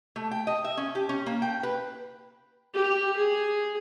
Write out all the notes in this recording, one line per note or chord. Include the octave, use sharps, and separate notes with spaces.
A3
G5
D#5
E5
C#4
G4
C#4
A#3
G5
B4
G4
G#4